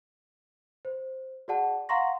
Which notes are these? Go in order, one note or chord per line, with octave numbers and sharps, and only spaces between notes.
C5
F#4 G#4 D5 F#5 A5
F5 F#5 A#5 C6 C#6 A#6